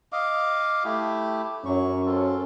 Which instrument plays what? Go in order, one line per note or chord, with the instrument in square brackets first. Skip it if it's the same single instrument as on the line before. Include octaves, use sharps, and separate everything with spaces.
[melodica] D#5 F5 D6
A3 E4 G4
[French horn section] F#2 C#4 [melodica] F#3 C#6
[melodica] C4 F4 A4